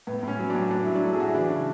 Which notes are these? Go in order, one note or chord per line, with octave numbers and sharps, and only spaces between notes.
A2 B3
A2 C#4
F#3
D4
A2
A2 D4
F#3 E4
D4
F#3 A4
G#4
A2 F#4
E4
E3 D4
C#3